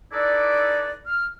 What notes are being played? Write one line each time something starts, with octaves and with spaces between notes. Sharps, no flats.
D#4 E4 A4 B4 D5
F6